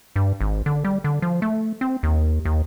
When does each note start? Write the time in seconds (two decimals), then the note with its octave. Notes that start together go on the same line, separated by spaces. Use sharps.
0.16 G2
0.41 G#1
0.66 D3
0.85 G3
1.04 D3
1.22 F3
1.42 A3
1.81 C4
2.03 D#2
2.45 D#2